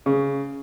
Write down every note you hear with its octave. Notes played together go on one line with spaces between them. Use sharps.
C#3